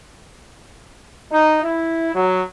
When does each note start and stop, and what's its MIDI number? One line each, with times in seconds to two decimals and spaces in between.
1.32 1.57 63
1.63 2.10 64
2.14 2.41 54